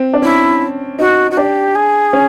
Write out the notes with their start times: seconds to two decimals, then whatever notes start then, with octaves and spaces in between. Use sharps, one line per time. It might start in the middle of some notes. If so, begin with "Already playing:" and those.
Already playing: C4
0.13 D4
0.22 C#4 E4
0.99 D#4 F#4
1.30 F#4
1.36 D4 G4
1.75 G#4
2.13 C#4